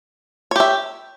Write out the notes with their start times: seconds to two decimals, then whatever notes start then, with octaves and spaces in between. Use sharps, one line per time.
0.51 C#5
0.56 G4
0.60 E5